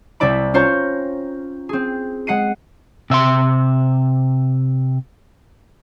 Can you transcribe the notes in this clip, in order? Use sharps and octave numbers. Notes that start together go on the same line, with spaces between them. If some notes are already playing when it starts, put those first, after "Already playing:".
C2 C3 E4 D5 B5
C#4 F4 C5 C#5 A#5
C4 G#4
G#3 F#5 C7 D#7
C3 E5 F5 C6